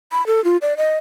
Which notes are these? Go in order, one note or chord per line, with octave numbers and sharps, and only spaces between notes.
B5
A4
F4
D5
D#5